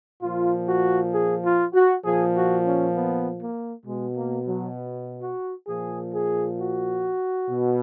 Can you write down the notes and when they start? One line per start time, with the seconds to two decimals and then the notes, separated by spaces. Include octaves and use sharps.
0.22 A#2 F3 F4
0.68 F#4
1.13 G#4
1.44 F4
1.74 F#4
2.04 A#2 F3 G#4
2.35 F#4
2.65 C#4
2.95 B3
3.41 A#3
3.85 B2 G#3
4.16 A#3
4.46 F#3
5.22 F#4
5.67 A#2 F3 G#4
6.14 G#4
6.59 F#4
7.49 B2